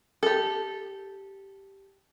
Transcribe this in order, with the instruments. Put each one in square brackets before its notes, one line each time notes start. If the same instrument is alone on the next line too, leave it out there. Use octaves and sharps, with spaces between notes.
[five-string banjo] G4 A4